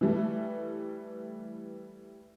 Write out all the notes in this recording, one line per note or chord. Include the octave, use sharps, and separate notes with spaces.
E3 G3 A3